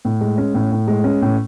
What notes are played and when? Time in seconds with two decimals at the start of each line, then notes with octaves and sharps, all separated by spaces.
0.05 A2
0.21 G#3
0.38 C#4
0.54 A2
0.72 A2
0.88 G#3
1.04 C#4
1.22 A2